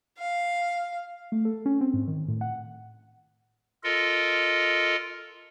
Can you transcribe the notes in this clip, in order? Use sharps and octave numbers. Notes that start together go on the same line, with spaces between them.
F5
A3
A4
C#4
C4
G#2
D#3
A2
F#5
F4 A4 A#4 D#5